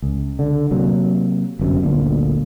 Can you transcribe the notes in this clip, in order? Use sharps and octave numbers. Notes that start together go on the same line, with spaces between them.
C#2
D3
C3 F#3 A#3
G1 F#2 C3
G1 D2 A#2